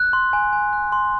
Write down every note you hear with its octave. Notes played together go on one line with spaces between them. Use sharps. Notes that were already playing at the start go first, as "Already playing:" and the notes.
Already playing: F#6
C6
G#5
G#5
F#6
C6